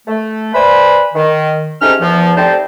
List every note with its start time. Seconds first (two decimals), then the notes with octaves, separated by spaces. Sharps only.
0.08 A3
0.55 B4 C5 D5 G#5 B5
1.14 D#3
1.81 G#2 C3 A3 C#4 D#4 F6
2.01 E2 F3
2.37 G3 A3 C4 D#4 C5 A5